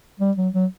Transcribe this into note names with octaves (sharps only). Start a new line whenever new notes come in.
G3
F#3
F#3